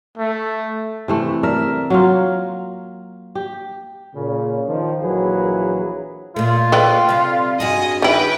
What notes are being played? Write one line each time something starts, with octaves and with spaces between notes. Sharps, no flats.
A3
C3 E3 A3
A#4 D5 E5
F#3 A#3 F4
G4
A#2 C#3
D#3 F3
A#1 E3 F#3 A#3 G#4 B4
A#2 A3 F4
A4 B4 G5
C3 G3
G2 F#4 G#4 D#5 G#5
D#3 E4 B4 G5